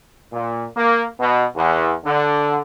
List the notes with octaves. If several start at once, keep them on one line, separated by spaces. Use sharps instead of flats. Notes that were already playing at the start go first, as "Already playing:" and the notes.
A#2
A#3
B2
E2
D3